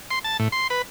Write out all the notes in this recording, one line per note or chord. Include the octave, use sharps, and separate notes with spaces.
C6
A5
A2
C6
B4